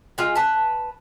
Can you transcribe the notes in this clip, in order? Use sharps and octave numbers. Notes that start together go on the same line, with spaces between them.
G#3 F4
B4 A5